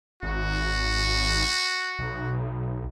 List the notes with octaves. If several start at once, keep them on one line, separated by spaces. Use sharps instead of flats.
G#1 F#4
B1